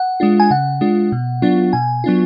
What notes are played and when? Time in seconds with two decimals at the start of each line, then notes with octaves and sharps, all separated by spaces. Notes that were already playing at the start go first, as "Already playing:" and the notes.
Already playing: F#5
0.20 G#3 D4 F4
0.40 G#5
0.51 C#3 F#5
0.81 G#3 D4 F4
1.12 B2
1.42 F#3 B3 D4 F4
1.73 B2 G#5
2.04 F#3 B3 D4 F4